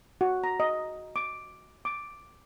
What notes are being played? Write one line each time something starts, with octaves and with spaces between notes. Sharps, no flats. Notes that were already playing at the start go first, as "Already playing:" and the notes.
F#4
A#5
D#5
D6
D6